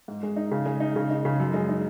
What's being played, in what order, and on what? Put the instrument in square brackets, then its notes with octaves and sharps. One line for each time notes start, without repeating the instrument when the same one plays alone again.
[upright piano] G#2
G#3
D#4
C#3
G#3
D#4
C#3
D#4
C#3
F#2
G#3
D#4